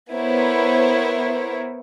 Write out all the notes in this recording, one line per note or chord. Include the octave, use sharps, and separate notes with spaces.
B3 E4 A#4 C5 C#5